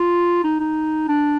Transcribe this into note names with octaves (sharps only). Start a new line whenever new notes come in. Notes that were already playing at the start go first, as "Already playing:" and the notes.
Already playing: F4
D#4
D#4
D4